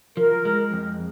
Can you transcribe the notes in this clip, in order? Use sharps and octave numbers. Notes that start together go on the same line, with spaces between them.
F3 A#4
G#3
F2